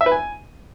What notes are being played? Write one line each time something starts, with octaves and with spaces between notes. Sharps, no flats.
E5
B4
G#5